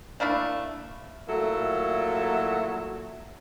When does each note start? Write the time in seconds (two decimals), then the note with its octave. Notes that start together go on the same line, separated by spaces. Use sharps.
0.20 A3 A#3 D4 E4
1.28 A#2 F#3 A3 A#3 E4 A4